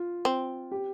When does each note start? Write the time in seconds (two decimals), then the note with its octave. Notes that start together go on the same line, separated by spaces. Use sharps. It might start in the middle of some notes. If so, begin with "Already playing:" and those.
Already playing: F4
0.25 C4
0.71 G4